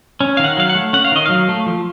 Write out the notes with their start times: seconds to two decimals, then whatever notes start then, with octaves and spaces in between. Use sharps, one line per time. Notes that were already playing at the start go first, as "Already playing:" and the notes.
0.20 C#4
0.37 D#3 F5
0.44 F#5
0.57 F#3 F5
0.69 F#5
0.75 A3
0.93 C#4 F#5
1.05 F5
1.12 D#3 D#5
1.26 F#3 F5
1.49 A3
1.66 F3